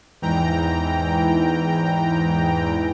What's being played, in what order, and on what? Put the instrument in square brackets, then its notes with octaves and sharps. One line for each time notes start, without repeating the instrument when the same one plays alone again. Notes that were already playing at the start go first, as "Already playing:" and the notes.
[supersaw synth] E2 G#2 E3 G5 A#5